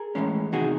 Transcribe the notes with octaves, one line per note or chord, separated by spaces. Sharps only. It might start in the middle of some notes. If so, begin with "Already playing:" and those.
Already playing: G#4 A#4
A2 E3 G#3 C#4
E2 C3 D#3 F#4 G#4